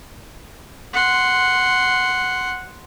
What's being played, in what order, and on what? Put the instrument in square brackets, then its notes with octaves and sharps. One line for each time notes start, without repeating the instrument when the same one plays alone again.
[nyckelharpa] F#5 C6